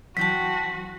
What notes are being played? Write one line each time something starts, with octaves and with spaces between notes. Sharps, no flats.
E3 F#3 C4 F#4 G5 A5 B6